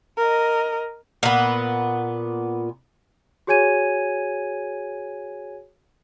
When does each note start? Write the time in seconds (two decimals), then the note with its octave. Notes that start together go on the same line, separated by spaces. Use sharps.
0.18 A#4 D#5
1.23 A#2 B3
3.47 F#4 G#4 C#5 G#5 G#6 D#7